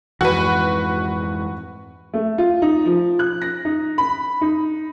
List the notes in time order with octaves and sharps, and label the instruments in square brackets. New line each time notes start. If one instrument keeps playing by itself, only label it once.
[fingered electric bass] F2 G#2 E3 [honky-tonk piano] F#4 B4
[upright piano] A3
F4
D#4
F3
F#6
A#6
D#4
B5
D#4